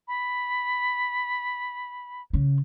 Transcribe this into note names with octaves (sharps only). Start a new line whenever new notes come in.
B5
C#3